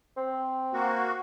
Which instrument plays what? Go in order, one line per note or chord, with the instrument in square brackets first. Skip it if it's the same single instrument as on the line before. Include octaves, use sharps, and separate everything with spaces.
[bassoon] C4
[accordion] A#3 F#4